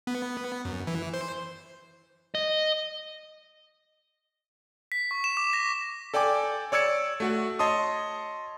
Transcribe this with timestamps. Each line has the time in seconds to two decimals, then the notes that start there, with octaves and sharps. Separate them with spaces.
0.07 B3
0.65 F#2
0.87 E3
1.14 C5
2.35 D#5
4.92 B6
5.11 C#6
5.24 E7
5.37 D6
5.53 A#6
6.14 A4 D5 G5 G#5 D6
6.72 C#5 D5 E6 G#6 C#7
7.20 A3 F#4 F#5
7.59 C#5 D#5 A5 C6 D#6